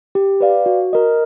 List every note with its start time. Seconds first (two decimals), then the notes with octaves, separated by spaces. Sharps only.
0.15 G4
0.41 B4 D5 F5
0.66 F#4
0.93 A#4 D#5